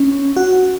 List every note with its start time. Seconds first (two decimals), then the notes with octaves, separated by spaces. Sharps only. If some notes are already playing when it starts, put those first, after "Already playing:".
Already playing: C#4
0.36 F#4